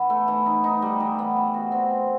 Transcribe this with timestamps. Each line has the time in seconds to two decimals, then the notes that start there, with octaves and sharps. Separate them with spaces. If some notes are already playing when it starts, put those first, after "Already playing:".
Already playing: E3 B3 E4
0.10 A3
0.28 E3
0.46 D#4
0.64 D#4
0.82 G3
1.00 E3
1.19 B3
1.36 E3
1.54 F#4
1.72 C4
1.90 A3